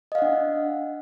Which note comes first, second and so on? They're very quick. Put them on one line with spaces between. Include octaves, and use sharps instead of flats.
D#5 F5 F#5 D4